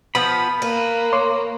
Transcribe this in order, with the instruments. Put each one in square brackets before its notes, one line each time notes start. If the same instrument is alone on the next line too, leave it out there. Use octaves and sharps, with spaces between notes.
[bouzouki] F3 B3 [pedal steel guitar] B5
[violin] A#3 [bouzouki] B4
[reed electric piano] C#5 C6 D6